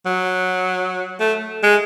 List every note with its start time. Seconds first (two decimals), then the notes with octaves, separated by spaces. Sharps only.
0.06 F#3
1.20 A3
1.63 G#3